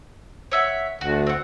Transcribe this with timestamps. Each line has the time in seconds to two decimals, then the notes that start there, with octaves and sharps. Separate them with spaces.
0.52 C#5 E5 F#5
1.01 D2 F#4
1.27 C4 F#5